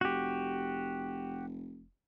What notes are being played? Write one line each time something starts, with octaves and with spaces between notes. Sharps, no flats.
F1 F#4 G4